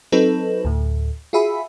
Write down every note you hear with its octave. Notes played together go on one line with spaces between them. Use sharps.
F#3 C4 D#4 A4 B4
D2 A2
F4 F#4 G#4 E5 B5